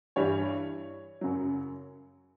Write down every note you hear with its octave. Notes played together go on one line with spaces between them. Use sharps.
G2 E3 G3 C#5
F#2 C#3 F#3